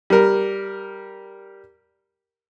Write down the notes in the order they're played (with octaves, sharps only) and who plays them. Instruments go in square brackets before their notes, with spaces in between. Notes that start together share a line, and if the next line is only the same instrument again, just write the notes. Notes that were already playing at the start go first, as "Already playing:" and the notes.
[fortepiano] G3 A#4